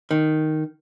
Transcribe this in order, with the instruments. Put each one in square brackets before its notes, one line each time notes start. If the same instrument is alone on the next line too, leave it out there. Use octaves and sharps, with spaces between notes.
[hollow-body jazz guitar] D#3